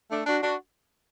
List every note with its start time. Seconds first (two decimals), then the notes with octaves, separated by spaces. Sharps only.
0.11 A3 D4
0.27 D4 F#4
0.43 D4 F#4